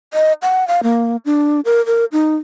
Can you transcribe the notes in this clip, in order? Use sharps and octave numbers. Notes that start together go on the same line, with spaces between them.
D#5
F#5
F5
A#3
D4
A#4
A#4
D#4